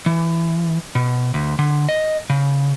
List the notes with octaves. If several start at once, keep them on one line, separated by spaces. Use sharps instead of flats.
E3
B2
D2
D3
D#5
C#3